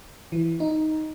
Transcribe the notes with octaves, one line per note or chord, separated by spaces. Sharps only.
E3
D#4